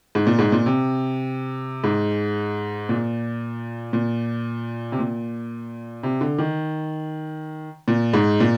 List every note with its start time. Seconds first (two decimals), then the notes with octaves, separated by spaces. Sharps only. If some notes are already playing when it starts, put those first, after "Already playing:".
0.15 G#2
0.27 A#2
0.39 G#2
0.52 A#2
0.66 C3
1.84 G#2
2.89 A#2
3.93 A#2
4.92 C3
4.99 A#2
6.03 C3
6.21 D3
6.39 D#3
7.88 A#2
8.13 G#2
8.40 A#2